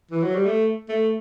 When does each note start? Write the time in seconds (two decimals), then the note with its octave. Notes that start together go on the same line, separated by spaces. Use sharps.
0.11 E3
0.23 F#3
0.35 G3
0.46 A3
0.89 A3